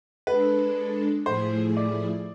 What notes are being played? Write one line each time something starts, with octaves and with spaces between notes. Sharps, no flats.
G#3 D4 A4 B4
A2 F3 A3 E4 G#4 C5
D5